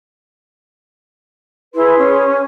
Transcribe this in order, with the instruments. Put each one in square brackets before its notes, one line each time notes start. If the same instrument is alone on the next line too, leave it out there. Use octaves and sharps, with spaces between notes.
[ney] E4 [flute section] G#4 B4 C6
[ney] C#4